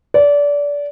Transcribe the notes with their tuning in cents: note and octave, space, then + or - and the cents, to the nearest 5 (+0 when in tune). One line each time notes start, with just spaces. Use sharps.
D5 -25